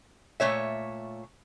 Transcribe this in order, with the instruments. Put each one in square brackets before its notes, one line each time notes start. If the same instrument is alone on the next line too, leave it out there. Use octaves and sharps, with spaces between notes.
[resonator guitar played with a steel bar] A#2 A3 C#5 E5